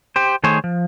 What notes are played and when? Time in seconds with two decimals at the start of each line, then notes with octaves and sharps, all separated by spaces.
0.16 G4 C5
0.44 D#3 A3 G#4 C5 C#5
0.64 F3